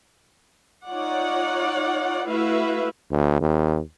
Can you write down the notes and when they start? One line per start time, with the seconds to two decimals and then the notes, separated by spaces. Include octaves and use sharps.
0.88 D#4 F4 C#5 D5 F#5
2.26 A3 E4 F#4 B4 E5 F5
3.11 D2
3.41 D#2